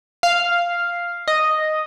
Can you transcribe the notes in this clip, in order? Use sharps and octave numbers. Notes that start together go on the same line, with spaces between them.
F5
D#5